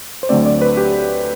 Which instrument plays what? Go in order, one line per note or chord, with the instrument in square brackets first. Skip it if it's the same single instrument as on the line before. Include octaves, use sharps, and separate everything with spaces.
[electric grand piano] C5
D2 D3 F#3 A3 C4 D5
D5
B4
G4